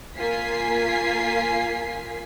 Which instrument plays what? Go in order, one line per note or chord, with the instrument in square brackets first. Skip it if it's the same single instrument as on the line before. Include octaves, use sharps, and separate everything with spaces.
[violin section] A#3 F4 G#5 B6 C7